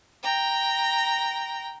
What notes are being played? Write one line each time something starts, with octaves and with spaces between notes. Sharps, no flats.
G5 A#5